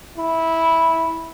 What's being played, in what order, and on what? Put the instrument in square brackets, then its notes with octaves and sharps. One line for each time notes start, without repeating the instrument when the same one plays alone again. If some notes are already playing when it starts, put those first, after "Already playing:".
[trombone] E4